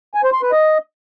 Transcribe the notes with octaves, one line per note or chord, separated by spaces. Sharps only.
G#5
C5
C6
B4
D#5